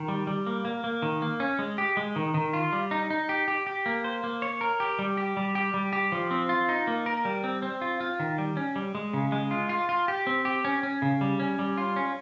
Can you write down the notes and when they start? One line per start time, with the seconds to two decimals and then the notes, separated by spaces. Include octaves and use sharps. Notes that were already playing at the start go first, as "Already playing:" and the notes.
Already playing: D#3
0.08 G3
0.27 G3
0.46 A#3
0.65 A#3
0.84 A#3
1.02 D#3
1.22 A#3
1.40 C#4
1.59 G#3
1.78 G4
1.97 G#3
2.16 D#3
2.34 D#3
2.53 F4
2.73 G3
2.91 D#4
3.10 D#4
3.29 G4
3.48 G4
3.67 G4
3.86 A#3
4.04 C5
4.24 A#3
4.42 C#5
4.61 A#4
4.80 G4
4.99 G3
5.17 G4
5.37 G3
5.55 G4
5.74 G3
5.93 G4
6.12 F3
6.31 C4
6.49 F4
6.69 D#4
6.87 A#3
7.06 A#4
7.25 G3
7.44 C4
7.62 C4
7.81 F4
8.00 F4
8.20 D#3
8.38 G3
8.57 C#4
8.76 G3
8.95 G#3
9.14 C#3
9.32 G#3
9.51 F4
9.69 F4
9.89 F4
10.08 G4
10.27 C4
10.45 G4
10.65 C#4
10.83 C#4
11.02 C#3
11.21 G3
11.40 C#4
11.59 G3
11.78 F4
11.96 C#4